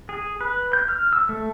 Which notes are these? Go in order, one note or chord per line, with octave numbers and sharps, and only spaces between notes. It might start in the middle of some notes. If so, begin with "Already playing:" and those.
G#4
B4
G6
F6
E6
A3